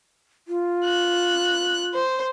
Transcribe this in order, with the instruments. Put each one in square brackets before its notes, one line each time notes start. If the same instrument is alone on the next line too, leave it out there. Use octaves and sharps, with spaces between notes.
[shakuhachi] F4
[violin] F#6
C5